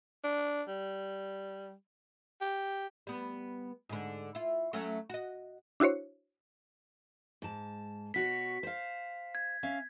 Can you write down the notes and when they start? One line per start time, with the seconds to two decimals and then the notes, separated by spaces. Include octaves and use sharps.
0.24 D4
0.68 G3
2.41 G4
3.07 G3 B3
3.89 G#2 D3
4.35 E4 F4
4.73 F#3 A3 C#4
5.10 F#4 D#5
5.80 D4 E4 F#4 C5 C#5
7.42 G#2 A5
8.14 B2 F#4 C#5 B6
8.63 C5 F5
9.35 G#6
9.63 C#4 E5 F5